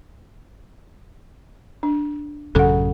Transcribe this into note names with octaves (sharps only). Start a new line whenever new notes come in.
D4
A1 F#2 C#3 A4 F#5